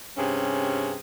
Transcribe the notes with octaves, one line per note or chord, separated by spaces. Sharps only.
G2 C3 C#4 G#4